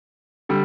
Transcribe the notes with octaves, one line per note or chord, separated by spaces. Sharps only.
D3 G3